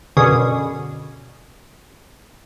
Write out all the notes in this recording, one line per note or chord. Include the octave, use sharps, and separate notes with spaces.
F#2 B2 D3 C#4 G#4 D#6